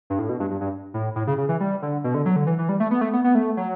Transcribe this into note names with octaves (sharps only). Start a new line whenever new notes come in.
G2
A2
B2
G2
G2
G2
A2
A2
C#3
C#3
E3
G3
D3
B2
D3
F#3
D3
E3
E3
G3
A3
B3
A3
B3
B3
A3
F#3